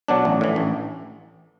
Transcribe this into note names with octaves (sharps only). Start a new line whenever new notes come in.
B2 F#3 D4
A1
A2 E3
A1